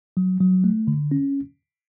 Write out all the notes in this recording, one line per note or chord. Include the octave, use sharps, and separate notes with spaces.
F#3
F#3
A3
D3
C#4